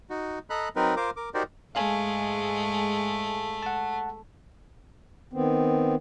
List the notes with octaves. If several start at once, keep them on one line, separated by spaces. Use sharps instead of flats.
D#4 F#4
A4 D#5 A#5 B5 F#6
F#3 C4 D#4 A#4 B4
F4 A#4 C5 D6
A#4 D6
D#4 F#4 G4 A#4 C5 D5
G#2 G#3 A3 F5 G#5
F#5 A5
D#3 B3 C4